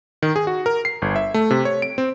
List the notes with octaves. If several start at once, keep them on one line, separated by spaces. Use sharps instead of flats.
D#3
G#4
F#4
A#4
C7
G1
E5
A3
C3
C#5
D7
C4